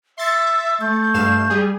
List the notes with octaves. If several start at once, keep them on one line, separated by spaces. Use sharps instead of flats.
E5 C6 A6 C#7
A3 G6
G2 F5 E7
G3 G#4